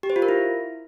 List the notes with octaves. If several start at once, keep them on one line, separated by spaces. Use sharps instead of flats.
G4
C5
F4
A#4
E4